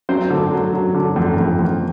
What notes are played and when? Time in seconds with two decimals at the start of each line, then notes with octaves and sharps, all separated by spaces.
0.09 F#3 C4 C5
0.30 D3
0.51 F#3
0.73 F#3
0.95 D3
1.16 F2
1.37 F2
1.59 F2